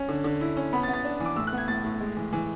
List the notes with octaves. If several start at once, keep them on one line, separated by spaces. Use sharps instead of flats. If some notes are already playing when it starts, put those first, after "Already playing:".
Already playing: C#4
D3
D3
E4
C#4
B3 B5
A6
B3
A6
D4
E3
D6
A2 E6
F#6
B3
G#6
A2 A6
A2
G#3
E3
E3